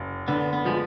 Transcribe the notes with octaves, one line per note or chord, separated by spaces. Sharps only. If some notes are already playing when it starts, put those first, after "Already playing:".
Already playing: F#1
D3 B3
B3
F3 G#3